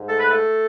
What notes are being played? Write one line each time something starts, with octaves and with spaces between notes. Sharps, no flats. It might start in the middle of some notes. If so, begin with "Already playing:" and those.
Already playing: G#2
A3 A4
B4
A3 A4